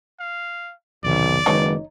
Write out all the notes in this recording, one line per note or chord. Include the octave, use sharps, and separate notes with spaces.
F5
B1 E2 C3 D#3 D5
F#1 D#3 G#3 D#4 B4 C#5